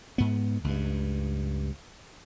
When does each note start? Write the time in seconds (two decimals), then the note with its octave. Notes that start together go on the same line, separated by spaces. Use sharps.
0.18 G#2 B3
0.64 C#2 G2